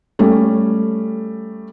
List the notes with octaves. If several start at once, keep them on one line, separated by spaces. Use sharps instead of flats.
G3 A3 C#4